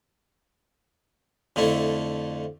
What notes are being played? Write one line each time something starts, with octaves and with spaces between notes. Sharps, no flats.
F2 D3 A3 E4